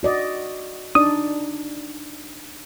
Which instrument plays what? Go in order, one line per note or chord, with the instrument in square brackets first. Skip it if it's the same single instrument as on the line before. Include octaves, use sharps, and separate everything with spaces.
[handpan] F#4 D5 D#5
[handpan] D4 D#4 D5 [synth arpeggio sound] D#6